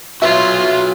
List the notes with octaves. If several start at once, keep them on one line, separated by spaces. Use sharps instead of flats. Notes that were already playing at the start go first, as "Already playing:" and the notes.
F4 F#4 B4 C#5 E5